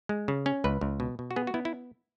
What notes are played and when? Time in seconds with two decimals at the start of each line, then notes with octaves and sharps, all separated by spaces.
0.09 G#3
0.28 C#3
0.46 C#4
0.64 C#2 B4
0.81 C#2
1.00 B2
1.19 B2
1.31 F#4
1.36 B3 G#4
1.47 F#4
1.54 B3 E4
1.65 E4